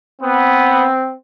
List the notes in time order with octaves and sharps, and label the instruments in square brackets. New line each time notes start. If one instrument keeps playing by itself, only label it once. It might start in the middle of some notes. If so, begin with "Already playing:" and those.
[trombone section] B3 [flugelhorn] C4